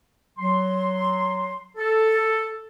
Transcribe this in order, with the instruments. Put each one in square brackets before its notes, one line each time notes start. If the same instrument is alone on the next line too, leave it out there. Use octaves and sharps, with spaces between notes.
[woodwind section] F#3 C6
A4